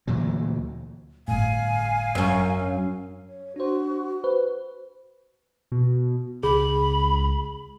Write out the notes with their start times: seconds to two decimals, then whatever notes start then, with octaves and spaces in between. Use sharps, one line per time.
0.07 D2 A#2 E3 F#3
1.28 G1 A2 F5 G#5
2.15 F#2 C#4
3.26 C#5
3.56 D4 F#4 C5
4.24 B4 C5
5.72 B2
6.43 C#2 G#4 B5